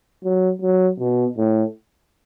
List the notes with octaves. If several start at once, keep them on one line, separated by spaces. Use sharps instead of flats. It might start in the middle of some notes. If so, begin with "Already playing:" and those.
F#3
F#3
B2
A2